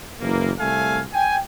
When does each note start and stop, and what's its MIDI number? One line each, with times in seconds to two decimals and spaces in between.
0.20 0.52 30
0.20 0.52 52
0.20 0.52 58
0.59 1.01 36
0.59 1.01 57
0.59 1.01 77
0.59 1.01 80
1.13 1.37 79
1.13 1.37 80